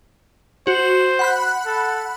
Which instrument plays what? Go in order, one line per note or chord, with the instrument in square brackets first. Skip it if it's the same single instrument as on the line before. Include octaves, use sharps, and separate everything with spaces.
[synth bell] F#4 [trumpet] C5
[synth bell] F#5 B5 F#6
[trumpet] A4